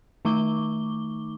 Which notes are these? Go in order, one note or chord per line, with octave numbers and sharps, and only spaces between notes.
D#3 A3 D#4 C#6 D6 G7